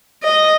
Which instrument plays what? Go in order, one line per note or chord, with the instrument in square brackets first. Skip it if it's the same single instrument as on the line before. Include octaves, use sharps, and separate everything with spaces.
[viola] D#5